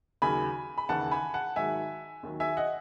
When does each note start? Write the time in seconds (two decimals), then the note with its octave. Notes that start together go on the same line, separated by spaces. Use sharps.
0.22 D#2 C#3 F#3 G#5 B5
0.78 B5
0.89 D#2 C#3 E3 F#5 A5
1.11 G#5 B5
1.34 F#5 A5
1.56 G#2 D#3 F#3 E5 G#5
2.23 D#2 D#3 F#3
2.40 E5 G#5
2.57 D#5 F#5